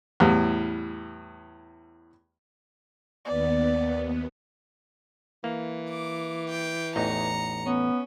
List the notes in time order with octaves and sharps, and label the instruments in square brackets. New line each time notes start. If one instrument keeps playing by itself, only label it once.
[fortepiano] E2 A2 G3
[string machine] D#2 B3 [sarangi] D5
[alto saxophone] E3 [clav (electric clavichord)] A#3
[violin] D6
G5
[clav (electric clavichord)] A1 E2 D#4 [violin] A#5 C#7
[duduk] B3 [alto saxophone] C#4